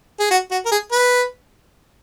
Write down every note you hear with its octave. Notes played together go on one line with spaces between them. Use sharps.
G#4
F#4
F#4
A#4
G#4
B4